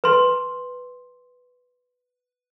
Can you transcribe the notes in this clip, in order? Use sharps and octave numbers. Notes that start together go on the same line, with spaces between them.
B4 C6